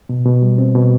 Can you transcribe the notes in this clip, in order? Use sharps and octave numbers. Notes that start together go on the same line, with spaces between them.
B2
B2
G3
C4
B2